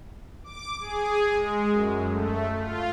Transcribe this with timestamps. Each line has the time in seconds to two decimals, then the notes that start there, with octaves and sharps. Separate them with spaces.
0.44 D6
0.80 G#4
1.30 G#3
1.71 F#2
2.10 A3
2.59 F4